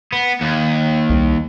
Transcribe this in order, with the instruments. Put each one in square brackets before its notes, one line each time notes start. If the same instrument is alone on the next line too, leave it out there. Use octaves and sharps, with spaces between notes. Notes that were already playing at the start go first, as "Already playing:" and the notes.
[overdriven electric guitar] B3
D#2
[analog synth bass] C2